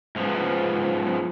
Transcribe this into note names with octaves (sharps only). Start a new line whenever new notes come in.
G#2 F3 B3